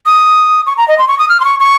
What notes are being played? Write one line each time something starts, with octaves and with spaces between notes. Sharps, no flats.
D#6
C#6
A#5
D#5
C6
C#6
D#6
F6
C6
C#6
C#6